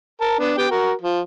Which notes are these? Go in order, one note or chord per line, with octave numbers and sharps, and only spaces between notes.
A#4 A5
B3 D4
B3 G4 G5
F#4 A#4
F3